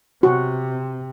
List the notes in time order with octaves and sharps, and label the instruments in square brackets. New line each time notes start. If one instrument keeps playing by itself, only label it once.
[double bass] C3 [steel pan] F#4